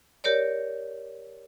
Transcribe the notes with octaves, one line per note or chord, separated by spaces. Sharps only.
G4 A#4 C#5 D5